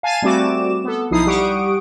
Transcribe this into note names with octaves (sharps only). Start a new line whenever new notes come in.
F5 G#5 A5 G#6 A6 D#7
G3 A3 C4 F#4 D6 E7
B3 A4
B1 F3 D#4 E4 D#6 C7
G3 G4 F#5 C#6 D#6 D7